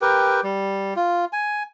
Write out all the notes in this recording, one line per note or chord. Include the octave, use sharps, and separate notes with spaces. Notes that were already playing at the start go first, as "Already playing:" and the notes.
G4 A#4 B4 G5
G3
F4
G#5